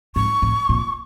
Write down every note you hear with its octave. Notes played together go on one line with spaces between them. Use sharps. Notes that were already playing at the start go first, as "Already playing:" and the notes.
G#2 C#6
A2
A#2